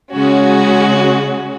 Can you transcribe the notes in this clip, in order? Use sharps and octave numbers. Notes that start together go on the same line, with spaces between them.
C#3 G#3 C#4 F#4